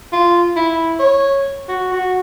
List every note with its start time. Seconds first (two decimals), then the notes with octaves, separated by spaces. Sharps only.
0.12 F4
0.56 E4
0.99 C#5
1.68 F#4
1.92 F#4